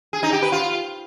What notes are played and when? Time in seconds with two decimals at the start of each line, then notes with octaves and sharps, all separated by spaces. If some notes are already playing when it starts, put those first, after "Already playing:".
0.13 G#4
0.23 D#4
0.33 G4
0.42 B4
0.52 F4